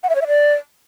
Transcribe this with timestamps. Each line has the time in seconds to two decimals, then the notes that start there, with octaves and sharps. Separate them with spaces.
0.03 F#5
0.09 E5
0.15 C#5
0.21 E5
0.27 D5